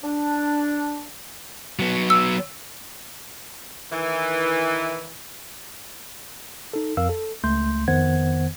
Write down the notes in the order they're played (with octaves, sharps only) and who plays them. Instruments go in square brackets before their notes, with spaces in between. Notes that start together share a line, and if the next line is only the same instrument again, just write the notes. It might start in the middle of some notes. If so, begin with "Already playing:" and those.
[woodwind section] D4
[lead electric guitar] F#3 B3
[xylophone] E6
[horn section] D#3 E3
[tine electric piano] D#4 A4
F2 A#4 F5 E6
A4
C#2 A3 C6 G6
F2 D#3 B3 C5 F#5 G#6